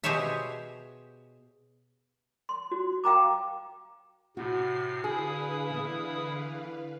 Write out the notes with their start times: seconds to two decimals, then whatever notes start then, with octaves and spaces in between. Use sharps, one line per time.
0.04 B2 G4 G#4 C5 C#5 E5
2.49 C6
2.72 F#4
3.04 F5 G5 A#5 D6
4.37 A2 C3 F#4 C7
5.04 D3 E4 G#4 B4 F5 D#6
5.70 E3 B3